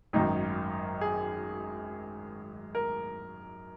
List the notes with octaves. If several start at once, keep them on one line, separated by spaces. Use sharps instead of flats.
G#1 F#2 D#3 D#4
G#4
A#4